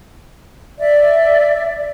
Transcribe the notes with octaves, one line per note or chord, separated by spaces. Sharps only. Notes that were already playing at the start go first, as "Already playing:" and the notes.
D5 E5